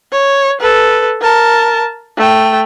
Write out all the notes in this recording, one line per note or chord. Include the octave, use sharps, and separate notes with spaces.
C#5
A4 B4
A#4 A5
A3 G5